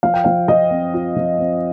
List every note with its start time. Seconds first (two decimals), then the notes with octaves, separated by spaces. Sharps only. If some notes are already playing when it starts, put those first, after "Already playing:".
0.03 F3 F5
0.14 G5
0.24 F3 F5
0.48 F3 D#5
0.71 C4
0.94 F4
1.16 F3
1.38 C4